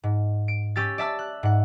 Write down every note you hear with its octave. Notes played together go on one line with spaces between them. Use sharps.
G#2
D7
C#4 G4 E6 A6
D5 E5 A5 E6
F#6
G#2 F#5